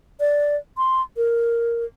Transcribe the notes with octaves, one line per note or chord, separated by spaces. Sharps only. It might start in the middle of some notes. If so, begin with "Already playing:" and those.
D5
C6
A#4